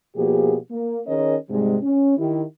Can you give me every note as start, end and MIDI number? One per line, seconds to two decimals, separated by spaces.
0.16 0.56 47
0.16 0.56 53
0.16 0.56 58
0.16 0.56 67
0.16 0.56 68
0.71 0.99 58
1.06 1.35 51
1.06 1.35 61
1.06 1.35 68
1.06 1.35 70
1.06 1.35 73
1.06 1.35 75
1.49 1.77 44
1.49 1.77 48
1.49 1.77 55
1.49 1.77 56
1.82 2.14 61
2.17 2.43 51
2.17 2.43 64
2.17 2.43 67